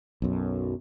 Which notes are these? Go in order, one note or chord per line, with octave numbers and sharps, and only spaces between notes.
B1 F#2